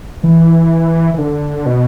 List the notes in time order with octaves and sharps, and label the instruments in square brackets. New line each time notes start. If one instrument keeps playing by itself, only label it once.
[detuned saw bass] E3
E3
D3
B2